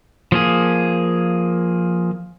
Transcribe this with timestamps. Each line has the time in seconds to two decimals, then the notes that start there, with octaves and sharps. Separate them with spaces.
0.32 F3 A#3 G#4